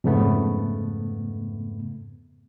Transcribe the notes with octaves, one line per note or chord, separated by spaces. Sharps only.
F2 G#2 C#3 A3 B3